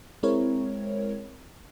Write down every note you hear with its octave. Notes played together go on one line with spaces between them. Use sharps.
G#3 C4 E4 A#4 C#5